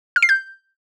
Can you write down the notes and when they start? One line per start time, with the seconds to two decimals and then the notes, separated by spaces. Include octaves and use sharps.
0.16 F6
0.22 C7
0.29 G6